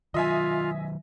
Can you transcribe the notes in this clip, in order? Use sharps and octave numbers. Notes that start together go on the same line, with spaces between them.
D#3 F#3 F4 D#5 E5 G#5